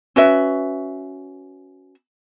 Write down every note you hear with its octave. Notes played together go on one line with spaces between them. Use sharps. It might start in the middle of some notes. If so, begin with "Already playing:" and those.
C#4 F#4 B4 E5